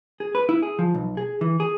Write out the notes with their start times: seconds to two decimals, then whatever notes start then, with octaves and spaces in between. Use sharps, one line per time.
0.20 G#4
0.35 B4
0.49 E4
0.62 G#4
0.79 F3
0.94 B1
1.17 G#4
1.41 E3
1.60 G#4